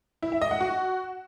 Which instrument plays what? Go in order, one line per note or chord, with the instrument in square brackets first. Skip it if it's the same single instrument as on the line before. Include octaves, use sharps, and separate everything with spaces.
[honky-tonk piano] E4
E5
D#5
F#5
F#4